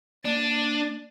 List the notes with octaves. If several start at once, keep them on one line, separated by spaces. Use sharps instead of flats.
A#3 D4 A6 D#7